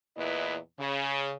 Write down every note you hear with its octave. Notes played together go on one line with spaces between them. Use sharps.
E2 A#2 E4 B4 D#5
C#3